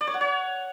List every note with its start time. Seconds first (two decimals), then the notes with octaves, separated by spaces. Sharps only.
0.01 D5
0.07 C#5
0.14 F#5
0.21 C#5